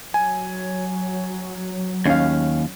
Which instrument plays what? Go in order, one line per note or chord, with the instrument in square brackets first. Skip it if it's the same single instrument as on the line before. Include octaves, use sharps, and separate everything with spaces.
[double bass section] F#3 [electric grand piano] G#5
[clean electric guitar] D#2 [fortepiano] C#4 F5